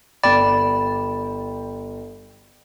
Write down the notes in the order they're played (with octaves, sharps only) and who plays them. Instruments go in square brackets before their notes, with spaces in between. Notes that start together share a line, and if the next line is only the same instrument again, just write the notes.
[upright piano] G1 G5 [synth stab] D5 [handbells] B5